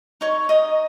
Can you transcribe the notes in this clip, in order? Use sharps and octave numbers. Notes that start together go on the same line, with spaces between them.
D#4 C#5 C#6
D#4 D#5 D#6